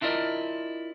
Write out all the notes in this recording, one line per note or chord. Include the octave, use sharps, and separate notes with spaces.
D4 E4 F4 A#4 D5 D#5